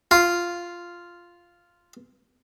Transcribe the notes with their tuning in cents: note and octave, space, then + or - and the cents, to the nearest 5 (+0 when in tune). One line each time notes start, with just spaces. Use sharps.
F4 -5